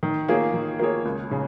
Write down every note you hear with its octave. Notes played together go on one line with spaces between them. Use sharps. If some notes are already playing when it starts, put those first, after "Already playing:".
D#3
A#3 F4 G#4 C#5
D#3
A#3 F4 G#4 C#5
C#2
C#3